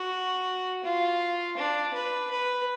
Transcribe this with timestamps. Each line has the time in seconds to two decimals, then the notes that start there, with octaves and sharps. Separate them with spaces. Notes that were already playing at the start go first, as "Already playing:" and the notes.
Already playing: F#4
0.84 F4
1.57 D4
1.93 B4
2.31 B4